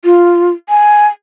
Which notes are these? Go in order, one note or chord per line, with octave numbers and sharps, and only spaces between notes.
F4
G#5